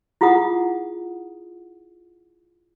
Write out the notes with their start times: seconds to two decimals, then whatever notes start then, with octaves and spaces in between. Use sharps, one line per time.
0.21 E4 F4 G#4 F#5 D#6